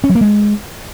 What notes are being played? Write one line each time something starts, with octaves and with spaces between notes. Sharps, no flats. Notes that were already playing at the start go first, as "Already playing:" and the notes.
C#4
F#3
A#3
G#3